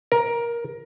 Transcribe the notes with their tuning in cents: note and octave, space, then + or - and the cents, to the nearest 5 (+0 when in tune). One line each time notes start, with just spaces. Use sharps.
A#4 +15